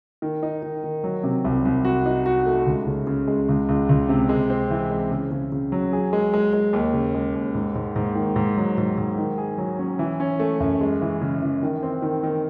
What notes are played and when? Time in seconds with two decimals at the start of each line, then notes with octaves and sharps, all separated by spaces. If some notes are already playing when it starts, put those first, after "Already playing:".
0.22 D#3
0.43 D#4
0.63 D#3
0.84 D#3
1.04 F#3
1.24 C3
1.44 C2
1.65 C2
1.85 F#4
2.06 D#4
2.26 F#4
2.46 A3
2.66 C#2
2.87 C#3
3.07 C#3
3.28 G#3
3.49 C#2
3.69 C#2
3.89 C#2
4.09 C3
4.29 G#3
4.50 C4
4.71 E3
4.90 G#3
5.11 C#3
5.31 C#3
5.52 C#3
5.72 F#3
5.93 G#4
6.13 G#3
6.34 G#3
6.53 G#3
6.73 D#2
6.94 C#3
7.14 G#3
7.35 D#2
7.55 G#2
7.75 G#2
7.96 G#2
8.16 D#3
8.36 G#2
8.57 F#3
8.78 G#2
8.97 G#2
9.18 D#3
9.38 G#4
9.58 F#3
9.79 C#4
9.99 E3
10.20 C#4
10.40 A3
10.60 F#2
10.81 G#3
11.02 E3
11.21 C#3
11.42 E3
11.63 D#3
11.83 C4
12.02 D#3
12.24 D#3